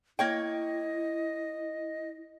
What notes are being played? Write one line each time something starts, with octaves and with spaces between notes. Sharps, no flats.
A#3 E4 C#5 D#5 G5